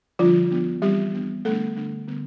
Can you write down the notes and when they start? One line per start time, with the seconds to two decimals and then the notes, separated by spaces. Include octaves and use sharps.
0.19 D3 F3 G3 D4 F4
0.50 F3 B3 D4
0.82 E3 G3 C4 G4
1.13 E3 B3 D4
1.45 D3 G3 A3 B3 D4 A4
1.76 D3 A3 D4
2.08 D3 G3 B3